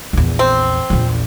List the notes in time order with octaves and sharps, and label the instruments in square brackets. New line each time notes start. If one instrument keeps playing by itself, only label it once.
[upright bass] A#1 E2
[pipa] C4
[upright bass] A#1 E2